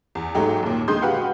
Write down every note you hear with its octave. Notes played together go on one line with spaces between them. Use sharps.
E2
G#2 F#3 A3 D#4 G4
D#2 A#2
D3 G#3 C6 D#6 G6
F#4 G4 B4 F5 F#5